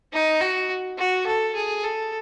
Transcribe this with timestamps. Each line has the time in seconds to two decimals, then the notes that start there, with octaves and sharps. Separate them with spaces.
0.13 D#4
0.41 F#4
0.98 F#4
1.26 A4
1.55 G#4
1.84 A4